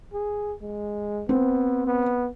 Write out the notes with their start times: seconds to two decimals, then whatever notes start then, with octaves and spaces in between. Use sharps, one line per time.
0.13 G#4
0.62 G#3
1.29 B3 C4
1.87 B3